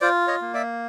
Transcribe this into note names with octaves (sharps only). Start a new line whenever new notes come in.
F4 C5 D5
C#5 D#5
A#3
D5 E5